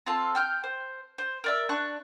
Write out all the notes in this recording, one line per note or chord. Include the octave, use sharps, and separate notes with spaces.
C4 F4 A4 A5
G5 F6 G6
C5
C5
A#4 D5 E5
D4 C#6 F#6